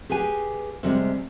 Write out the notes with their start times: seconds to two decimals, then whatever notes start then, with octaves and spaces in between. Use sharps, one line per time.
0.10 G4 G#4 B4 G#5
0.83 C3 G3 G#3